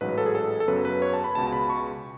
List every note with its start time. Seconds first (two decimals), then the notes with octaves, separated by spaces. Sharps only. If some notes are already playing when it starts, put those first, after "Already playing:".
0.01 A1 G#2 F#3 B4
0.18 A4
0.26 G#4
0.35 A4
0.60 A4
0.68 F#2 C#3 F#3 B3 B4
0.85 B4
1.02 C#5
1.14 A5
1.24 B5
1.35 C#2 B2 G#3 A5
1.47 A5
1.53 B5
1.70 C#6